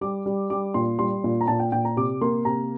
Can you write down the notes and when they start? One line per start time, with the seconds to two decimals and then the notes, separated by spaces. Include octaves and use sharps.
0.01 G3 D6
0.26 G3
0.50 G3 D6
0.74 A#2 C6
0.99 G3 C6
1.24 A#2
1.41 A#5
1.48 A#2 A5
1.60 G5
1.72 A#2 G5
1.85 A#5
1.97 C3 D6
2.21 A#3 C6
2.45 C3 A#5